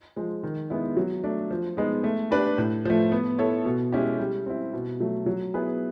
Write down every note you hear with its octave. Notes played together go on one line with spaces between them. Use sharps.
F3 G#3
D#3
G#3 B3 E4
F#3
A3 D4
F3
G#3 B3 D#4
A3
D4 G4 B4
A2
F3 A3
B3
E4 A4 C#5
B2
G#3 C#4 E4 G4
G3
C4 E4
B2
F#3 A3
F#3
B3 E4 G#4 B4